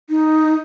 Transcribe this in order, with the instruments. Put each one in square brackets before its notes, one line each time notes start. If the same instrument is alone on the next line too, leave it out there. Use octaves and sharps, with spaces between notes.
[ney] D#4